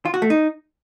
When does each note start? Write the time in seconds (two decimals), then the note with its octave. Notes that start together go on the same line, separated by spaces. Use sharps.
0.05 F4
0.14 F#4
0.22 A3
0.30 D#4